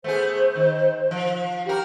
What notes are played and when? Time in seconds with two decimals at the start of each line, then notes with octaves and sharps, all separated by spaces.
0.04 A3 B3 G#4 C5
0.55 D#3
1.11 F3
1.66 F#4 G4 A#4